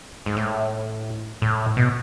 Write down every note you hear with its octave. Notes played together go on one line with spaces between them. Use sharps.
G#2
A2
A2
B2